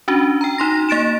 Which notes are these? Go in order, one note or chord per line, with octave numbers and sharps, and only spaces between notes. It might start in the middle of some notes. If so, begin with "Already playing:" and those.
C#4 D4 F#4
G5 A#5
D#4 C6 A#6
A#3 A6 D7 E7